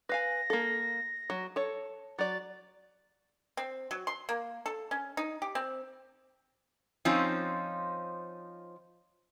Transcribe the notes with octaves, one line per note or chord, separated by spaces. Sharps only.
B4 F5 G#5 A#6
A#3 A4
F#3
A4 C#5
F#3 D5 A6
C4
F#3
C6
A#3
A4
C#4
D#4
G4
C4
F3 C4 C#4 D#4 F4